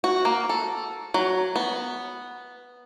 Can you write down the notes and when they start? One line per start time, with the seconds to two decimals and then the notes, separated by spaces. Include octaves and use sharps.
0.04 F#4
0.25 A#3
0.49 A4
1.14 F#3
1.56 B3